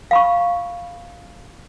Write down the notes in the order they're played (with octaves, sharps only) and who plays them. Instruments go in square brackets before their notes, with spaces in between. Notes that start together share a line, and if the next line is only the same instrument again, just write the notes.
[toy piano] F5 B5 C#6